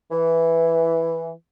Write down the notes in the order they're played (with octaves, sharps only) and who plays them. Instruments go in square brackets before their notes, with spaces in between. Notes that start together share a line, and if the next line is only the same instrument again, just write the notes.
[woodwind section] E3